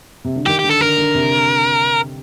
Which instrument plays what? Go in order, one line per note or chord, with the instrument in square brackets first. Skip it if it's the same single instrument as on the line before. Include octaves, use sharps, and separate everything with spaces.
[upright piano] C3
D3
[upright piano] D#3 [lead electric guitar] G4
[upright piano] D3 [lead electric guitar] G4
[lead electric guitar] A4
[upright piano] D3 [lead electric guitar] A#4
[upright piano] D3
C3